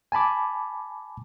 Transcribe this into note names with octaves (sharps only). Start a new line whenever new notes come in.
G#5 A5 B5 D6